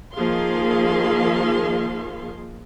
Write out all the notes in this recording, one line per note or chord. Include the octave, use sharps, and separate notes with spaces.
D#3 F3 A#3 G#4 F5 C6